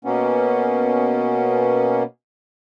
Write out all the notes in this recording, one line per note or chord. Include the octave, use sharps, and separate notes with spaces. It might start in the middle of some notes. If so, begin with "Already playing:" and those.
B2 A#3 B3 C#4